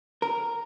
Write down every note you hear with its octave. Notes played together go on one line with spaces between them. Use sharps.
A#4